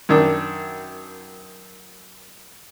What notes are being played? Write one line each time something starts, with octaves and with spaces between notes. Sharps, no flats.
F#2 D#3 D4